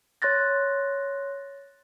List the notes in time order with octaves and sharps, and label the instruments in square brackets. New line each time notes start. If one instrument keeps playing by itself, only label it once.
[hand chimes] C#5 C6 F#6 A6 A#6